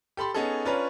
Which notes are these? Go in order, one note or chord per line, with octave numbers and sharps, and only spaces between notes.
G4 A4 B5 C6
B3 C#4 D#4 G#4 A4
C#4 D4 F4 B4 C#5 A#5